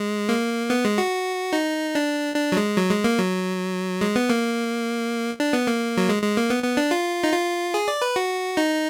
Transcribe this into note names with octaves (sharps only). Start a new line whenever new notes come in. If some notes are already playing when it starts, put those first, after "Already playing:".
Already playing: G#3
A#3
B3
G#3
F#4
D#4
D4
D4
F#3
G#3
F#3
G#3
A#3
F#3
G#3
B3
A#3
D4
B3
A#3
F#3
G#3
G#3
A#3
B3
B3
D4
F4
D#4
F4
G#4
D5
B4
F#4
D#4